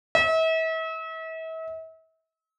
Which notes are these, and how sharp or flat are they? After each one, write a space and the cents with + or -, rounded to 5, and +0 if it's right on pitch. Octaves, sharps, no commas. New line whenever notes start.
E5 -40